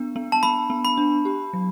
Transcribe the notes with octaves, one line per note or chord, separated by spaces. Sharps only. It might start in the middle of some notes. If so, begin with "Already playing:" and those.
Already playing: B3 D4
B3
A5
B3 B5
B3
B5
D4
G4
F#3